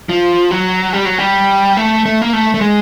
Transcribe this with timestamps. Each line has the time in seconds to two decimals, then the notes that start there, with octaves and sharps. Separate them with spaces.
0.09 F3
0.51 F#3
0.93 G3
1.05 F#3
1.18 G3
1.77 A3
2.05 A3
2.22 A#3
2.33 A3
2.54 A3
2.61 G#3